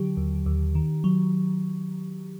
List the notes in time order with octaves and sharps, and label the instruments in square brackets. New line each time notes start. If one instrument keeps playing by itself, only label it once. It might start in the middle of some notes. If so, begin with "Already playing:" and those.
Already playing: [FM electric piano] D3 F#3 G4
D#2
D#2
D#3
F#3